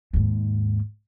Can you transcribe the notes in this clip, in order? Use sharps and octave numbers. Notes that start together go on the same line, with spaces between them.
D#2 G#2